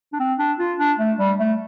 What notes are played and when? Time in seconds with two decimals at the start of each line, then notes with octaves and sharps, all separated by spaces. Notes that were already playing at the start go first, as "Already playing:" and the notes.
0.13 D4
0.20 C4
0.39 D4
0.59 F4
0.78 D4
0.98 A3
1.18 G3
1.39 A3